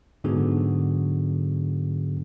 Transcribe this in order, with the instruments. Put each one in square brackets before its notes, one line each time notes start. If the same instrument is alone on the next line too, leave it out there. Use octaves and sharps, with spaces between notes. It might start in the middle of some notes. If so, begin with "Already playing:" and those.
[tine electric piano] G#2 D3 F#3 B3 F#4 G#4